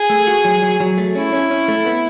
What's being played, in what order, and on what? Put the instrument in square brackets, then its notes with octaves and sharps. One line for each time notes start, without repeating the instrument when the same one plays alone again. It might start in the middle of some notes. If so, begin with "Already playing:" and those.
Already playing: [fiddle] G#4
[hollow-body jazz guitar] A3
F#4
F#3
F#3
F#3
A3
[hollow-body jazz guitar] C#4 [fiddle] E4
[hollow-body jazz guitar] C#4
C#4
A3
B3